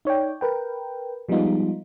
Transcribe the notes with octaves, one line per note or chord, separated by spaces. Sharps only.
D#4 C#5 D5 G5
A#4 B4 G5
F3 G3 G#3 B3 D#4 F4